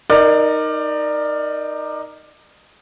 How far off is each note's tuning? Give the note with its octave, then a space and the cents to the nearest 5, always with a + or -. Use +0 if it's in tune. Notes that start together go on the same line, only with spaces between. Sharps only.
D#4 +0 A#4 +0 D5 +20